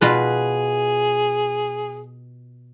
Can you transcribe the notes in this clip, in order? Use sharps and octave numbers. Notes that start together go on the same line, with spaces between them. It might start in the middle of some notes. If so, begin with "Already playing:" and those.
B2 F4 G#4 B4